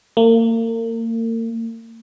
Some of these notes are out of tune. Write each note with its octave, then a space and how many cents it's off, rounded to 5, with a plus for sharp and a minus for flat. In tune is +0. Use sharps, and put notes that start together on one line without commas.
A#3 -40